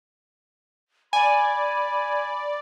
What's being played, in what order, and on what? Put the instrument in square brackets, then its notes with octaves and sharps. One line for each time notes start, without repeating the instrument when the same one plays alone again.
[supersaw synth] D5 [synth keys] G#5 [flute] B5